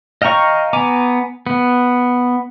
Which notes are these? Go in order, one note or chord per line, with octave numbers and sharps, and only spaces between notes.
D#5 F5 G5 A#5 C#6
B3 G#5 A#5 D6
B3